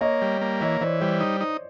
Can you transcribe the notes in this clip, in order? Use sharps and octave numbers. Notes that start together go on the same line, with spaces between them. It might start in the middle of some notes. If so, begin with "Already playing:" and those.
A#3 C#5 D#5
G3
A#3
E3 C#5 D#5
E3 C5 D5
G3 C5 D5
D#4
D#4